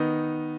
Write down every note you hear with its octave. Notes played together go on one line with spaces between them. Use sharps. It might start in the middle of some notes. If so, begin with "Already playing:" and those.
Already playing: D#3 B3 D#4